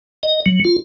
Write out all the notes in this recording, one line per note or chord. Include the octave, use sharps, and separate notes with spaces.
D#5
F#3
F4